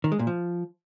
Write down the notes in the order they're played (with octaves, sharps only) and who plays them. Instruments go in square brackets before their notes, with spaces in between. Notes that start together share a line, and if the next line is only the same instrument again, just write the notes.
[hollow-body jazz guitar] D#3
G#3
A#2
F3